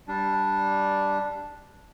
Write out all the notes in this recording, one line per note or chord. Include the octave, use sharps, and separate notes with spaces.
G3 D4